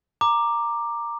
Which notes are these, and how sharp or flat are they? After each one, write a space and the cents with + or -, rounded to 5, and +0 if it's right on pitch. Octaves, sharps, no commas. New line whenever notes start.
A#5 +0 D6 +10